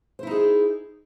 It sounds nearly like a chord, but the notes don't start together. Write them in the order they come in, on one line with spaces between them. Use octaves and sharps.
C5 E4 D#4 G#4